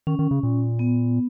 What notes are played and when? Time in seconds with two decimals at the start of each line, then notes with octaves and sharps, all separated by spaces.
0.07 D#3 C#4
0.19 D#3
0.31 C#3
0.43 A#2
0.79 B3